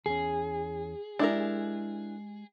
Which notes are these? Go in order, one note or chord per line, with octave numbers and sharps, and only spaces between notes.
E2 C#4 G#4
G#3 D4 E4 G4 A#4 G#5